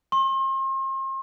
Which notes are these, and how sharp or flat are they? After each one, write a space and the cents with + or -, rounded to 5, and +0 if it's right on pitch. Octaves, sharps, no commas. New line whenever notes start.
C6 +40